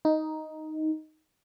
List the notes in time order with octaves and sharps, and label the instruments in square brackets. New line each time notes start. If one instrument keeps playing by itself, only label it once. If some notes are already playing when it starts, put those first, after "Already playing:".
[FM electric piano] D#4